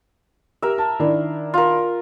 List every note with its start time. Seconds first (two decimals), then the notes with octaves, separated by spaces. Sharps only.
0.62 G4 A#4 E5
0.78 A5
1.00 D#3 D4 E4
1.54 F4 A#4